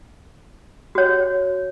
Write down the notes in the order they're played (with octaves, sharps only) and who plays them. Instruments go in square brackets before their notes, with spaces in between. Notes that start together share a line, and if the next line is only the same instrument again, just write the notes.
[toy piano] F#4 C#5